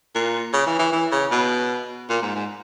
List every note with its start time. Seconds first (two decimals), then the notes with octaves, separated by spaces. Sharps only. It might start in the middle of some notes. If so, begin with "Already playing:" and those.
0.15 A#2
0.53 C#3
0.66 E3
0.79 E3
0.92 E3
1.12 C#3
1.31 B2
2.09 A#2
2.22 G#2
2.35 G#2